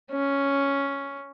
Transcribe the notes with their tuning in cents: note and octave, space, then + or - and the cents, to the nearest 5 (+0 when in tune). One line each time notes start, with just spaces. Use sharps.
C#4 +5